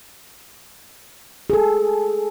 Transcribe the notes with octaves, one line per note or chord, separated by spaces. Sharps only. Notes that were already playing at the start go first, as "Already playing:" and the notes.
G#4 A4